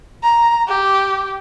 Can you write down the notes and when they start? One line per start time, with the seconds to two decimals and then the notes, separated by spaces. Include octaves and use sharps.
0.23 A#5
0.68 G4